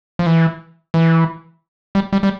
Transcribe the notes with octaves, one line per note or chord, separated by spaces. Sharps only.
F3
E3
E3
G3
G3
G3